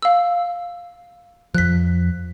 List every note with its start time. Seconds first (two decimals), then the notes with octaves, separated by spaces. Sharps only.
0.02 F5 E6
1.55 F2 F3 F#6 B6